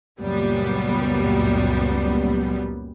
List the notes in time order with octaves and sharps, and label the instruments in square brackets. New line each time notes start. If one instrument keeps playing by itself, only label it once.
[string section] C#2 F#2 A#2 G3 B3